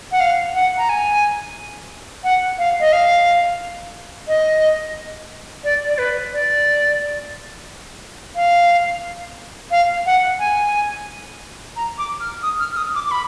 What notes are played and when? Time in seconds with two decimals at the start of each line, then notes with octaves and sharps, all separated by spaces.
0.12 F#5
0.20 F5
0.55 F#5
0.77 A#5
0.89 G#5
2.24 F#5
2.58 F5
2.80 D#5
2.92 F5
4.28 D#5
5.64 D5
5.87 D5
5.98 B4
6.32 D5
8.36 F5
9.71 F5
10.06 F#5
10.39 G#5
11.76 A#5
11.98 D6
12.20 F6
12.43 D#6
12.60 F6
12.72 F6
12.77 D#6
12.95 D6
13.07 D6
13.11 B5